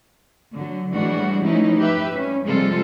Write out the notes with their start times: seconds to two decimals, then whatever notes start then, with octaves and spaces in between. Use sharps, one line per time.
0.54 D3 F#3
0.93 A2 E3 G3 G#3 D4 F#4
1.44 E3 F3 A3 C#4 D#4 E4
1.78 G4 B4 E5
2.14 G3 C#4
2.45 C3 F3 G3 G#3 F4 A4